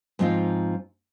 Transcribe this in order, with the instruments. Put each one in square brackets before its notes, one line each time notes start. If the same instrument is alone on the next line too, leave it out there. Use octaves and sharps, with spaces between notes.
[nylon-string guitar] G#2 F3 C4 D#4 F4